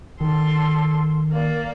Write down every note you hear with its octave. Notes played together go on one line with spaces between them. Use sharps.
D#3 A4 C6
A#3 D5